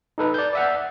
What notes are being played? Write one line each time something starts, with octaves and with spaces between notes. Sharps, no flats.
D#4 A4 B4
D5 G6
D5 E5 F#5